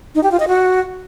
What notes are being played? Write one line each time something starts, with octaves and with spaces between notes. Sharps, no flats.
D#4
G4
F4
D#5
F#4